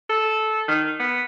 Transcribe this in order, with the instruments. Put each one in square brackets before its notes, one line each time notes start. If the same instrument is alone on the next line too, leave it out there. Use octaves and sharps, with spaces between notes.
[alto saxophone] A4
D#3
B3